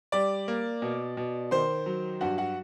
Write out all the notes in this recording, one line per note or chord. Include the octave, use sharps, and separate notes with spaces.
G3 D5 D6
A#3
B2
B2
D#3 C5 C6
F#3
G2 F#4 F#5
F#4 F#5